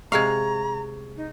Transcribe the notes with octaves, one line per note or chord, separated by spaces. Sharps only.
C3 G#3 F5 A#5 C#6 G#6
D#4